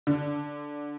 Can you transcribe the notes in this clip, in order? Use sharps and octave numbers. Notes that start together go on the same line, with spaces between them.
D3